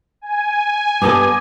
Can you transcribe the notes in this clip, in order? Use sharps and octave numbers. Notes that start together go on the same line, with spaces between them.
G#5
G2 B3 A4 D5 D#5